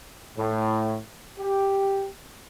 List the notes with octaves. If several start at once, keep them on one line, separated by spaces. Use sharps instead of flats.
A2
G4